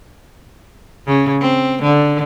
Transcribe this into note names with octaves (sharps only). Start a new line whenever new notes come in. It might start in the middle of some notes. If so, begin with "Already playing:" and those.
C#3
C4
D3